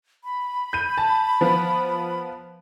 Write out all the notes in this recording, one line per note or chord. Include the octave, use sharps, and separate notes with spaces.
B5
G6 D#7
A5
F3 B3